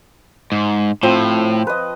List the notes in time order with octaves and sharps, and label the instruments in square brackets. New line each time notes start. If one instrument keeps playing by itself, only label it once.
[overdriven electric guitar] G#2
[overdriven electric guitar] A2 [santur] F3 C4
[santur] B4 D#5